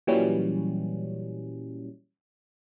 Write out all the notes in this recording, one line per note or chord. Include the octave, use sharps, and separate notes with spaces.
A#2 E3 F#3 G3 C#4